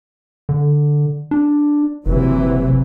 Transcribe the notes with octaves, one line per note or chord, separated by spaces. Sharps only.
D3
D4
F#1 C3 E3 F#3